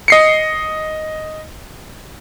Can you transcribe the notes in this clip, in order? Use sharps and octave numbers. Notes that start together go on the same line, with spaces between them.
D#5 C7 C#7